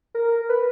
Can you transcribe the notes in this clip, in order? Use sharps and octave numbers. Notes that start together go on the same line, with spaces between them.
A#4
B4